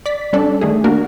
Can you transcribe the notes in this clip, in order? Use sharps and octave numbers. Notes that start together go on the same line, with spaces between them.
D5 B6
G3 C#4 D4 A4 D5
D#3 A3 G#4
A#3 D4 F#4 A#4